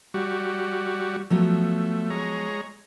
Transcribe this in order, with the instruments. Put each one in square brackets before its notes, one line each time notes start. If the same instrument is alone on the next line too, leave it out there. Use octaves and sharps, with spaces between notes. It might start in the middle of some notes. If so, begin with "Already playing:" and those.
[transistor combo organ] G3 F#4
[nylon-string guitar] F3 F#3 B3 [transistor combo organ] A3
[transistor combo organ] G#3 C#5 A#5